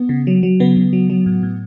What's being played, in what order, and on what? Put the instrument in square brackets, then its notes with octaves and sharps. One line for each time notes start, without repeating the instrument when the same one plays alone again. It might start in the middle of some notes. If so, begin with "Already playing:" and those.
Already playing: [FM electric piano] B3
C#3
F#3
F#3
C#3 B3
C#3
F#3
F#3
A2
A2